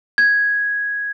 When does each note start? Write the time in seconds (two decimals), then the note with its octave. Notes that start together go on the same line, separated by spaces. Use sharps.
0.18 G#6